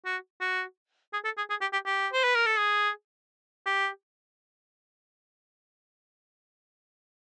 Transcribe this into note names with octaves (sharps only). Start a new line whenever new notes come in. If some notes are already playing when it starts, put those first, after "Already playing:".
F#4
F#4
G#4
A4
G#4
G#4
G4
G4
G4
C5
B4
A#4
A4
G#4
G4